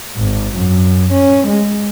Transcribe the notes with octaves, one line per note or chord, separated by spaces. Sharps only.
G#1
F#2
C#4
G#3